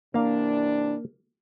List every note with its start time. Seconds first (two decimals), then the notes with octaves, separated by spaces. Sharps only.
0.14 C3 E3 A#3 D4 F5